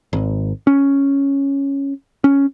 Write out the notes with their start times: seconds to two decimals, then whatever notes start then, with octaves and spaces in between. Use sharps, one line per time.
0.13 G#1
0.67 C#4
2.24 C#4